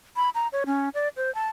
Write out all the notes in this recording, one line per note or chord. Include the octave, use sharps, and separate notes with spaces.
B5
A#5
C#5
C#4
D5
C5
A5